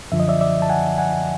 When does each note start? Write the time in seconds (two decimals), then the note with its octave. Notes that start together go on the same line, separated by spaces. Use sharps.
0.12 F#2 D3 F3 E5
0.20 D#5
0.28 D5 E5
0.41 D5 E5
0.62 A5
0.69 F#5 G#5
0.98 F#5 G#5